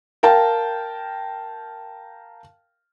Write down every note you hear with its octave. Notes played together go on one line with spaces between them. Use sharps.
A#4 F5 G5 A5